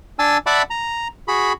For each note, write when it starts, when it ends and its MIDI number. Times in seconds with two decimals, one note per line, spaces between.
0.19 0.38 62
0.19 0.38 80
0.19 0.38 81
0.19 0.38 88
0.46 0.62 74
0.46 0.62 76
0.46 0.62 78
0.46 0.62 81
0.46 0.62 83
0.46 0.62 86
0.70 1.08 82
1.28 1.53 66
1.28 1.53 68
1.28 1.53 83